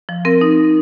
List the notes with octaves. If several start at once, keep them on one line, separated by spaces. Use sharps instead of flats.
F3
C4 A#4
D#4